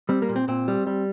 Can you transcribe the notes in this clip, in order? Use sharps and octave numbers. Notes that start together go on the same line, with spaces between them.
G3 C4
A#3
A#2
C4
A#2 C4
G3
G3